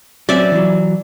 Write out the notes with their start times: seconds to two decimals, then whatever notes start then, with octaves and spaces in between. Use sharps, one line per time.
0.29 F#3 C4 C#4 D5 E5
0.52 E3 F#3